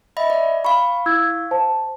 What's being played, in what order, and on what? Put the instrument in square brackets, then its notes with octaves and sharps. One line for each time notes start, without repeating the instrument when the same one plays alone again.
[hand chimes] D#5 E5 B5
D5
[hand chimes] F5 C#6 [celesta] B5
[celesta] E4 E6 G#6
C5 A5